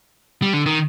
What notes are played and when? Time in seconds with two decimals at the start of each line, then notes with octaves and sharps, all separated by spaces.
0.42 G3
0.53 D3
0.66 D#3